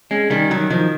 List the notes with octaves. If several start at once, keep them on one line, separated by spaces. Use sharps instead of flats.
G#3 C#4
D#3 G3
D#3 F#3
D#3 F3